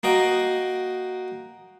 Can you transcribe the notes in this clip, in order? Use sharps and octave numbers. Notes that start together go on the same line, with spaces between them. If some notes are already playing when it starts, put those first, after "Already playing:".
A#3 F#4 D#5 G5